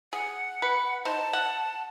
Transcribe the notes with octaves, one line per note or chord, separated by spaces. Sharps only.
G#4 F#5
B4
D#4 C5 A5
F#5